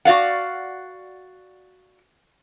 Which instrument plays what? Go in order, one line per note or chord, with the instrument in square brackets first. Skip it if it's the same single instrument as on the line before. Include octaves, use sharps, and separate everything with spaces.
[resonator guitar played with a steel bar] F#4 D5 F5 F#5